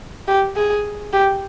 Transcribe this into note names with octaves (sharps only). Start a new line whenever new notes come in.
G4
G#4
G4